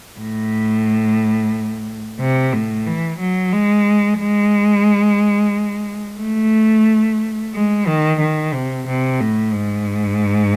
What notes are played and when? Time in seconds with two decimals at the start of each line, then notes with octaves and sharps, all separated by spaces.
0.20 A2
2.20 C3
2.53 A2
2.87 E3
3.20 F#3
3.53 G#3
4.20 G#3
6.20 A3
7.54 G#3
7.87 D#3
8.20 D#3
8.54 C3
8.88 C3
9.21 A2
9.54 G#2